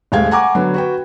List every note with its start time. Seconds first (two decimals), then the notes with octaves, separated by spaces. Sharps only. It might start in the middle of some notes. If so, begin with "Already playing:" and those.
0.12 D#1 G#3 A3 F5 G5 G#6
0.31 F#5 G#5 A#5 C#6 D6
0.55 D3 F#3 B3
0.74 F#4 B4 G5